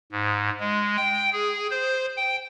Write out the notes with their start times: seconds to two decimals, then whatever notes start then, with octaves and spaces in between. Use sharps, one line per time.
0.12 G#2
0.60 G#3
0.97 G5
1.32 G#4
1.71 C5
2.17 G5